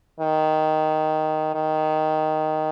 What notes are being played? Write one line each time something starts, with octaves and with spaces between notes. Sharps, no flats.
D#3
D#3